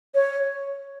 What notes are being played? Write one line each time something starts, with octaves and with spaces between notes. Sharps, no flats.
C#5